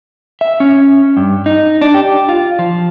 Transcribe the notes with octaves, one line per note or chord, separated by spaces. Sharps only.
E5
C#4
G2
D#4
D4
G4
F4
F3